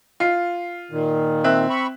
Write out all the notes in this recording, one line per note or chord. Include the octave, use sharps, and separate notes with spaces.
F4 C7
A#2 D#3
C4 E5 F#6
B5 C#6